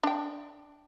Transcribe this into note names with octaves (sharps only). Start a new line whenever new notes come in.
D4 G5